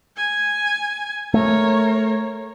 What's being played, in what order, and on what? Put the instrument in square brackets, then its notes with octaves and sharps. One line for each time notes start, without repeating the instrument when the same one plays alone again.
[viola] G#5
[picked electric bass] A3 [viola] A#4 C#5